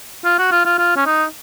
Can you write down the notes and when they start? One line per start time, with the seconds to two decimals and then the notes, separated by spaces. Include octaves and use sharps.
0.24 F4
0.39 F#4
0.52 F4
0.65 F4
0.78 F4
0.96 C#4
1.06 D#4